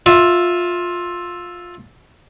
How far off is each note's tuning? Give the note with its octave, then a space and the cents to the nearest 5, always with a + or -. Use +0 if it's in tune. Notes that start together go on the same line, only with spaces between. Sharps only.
F4 +15 E5 +0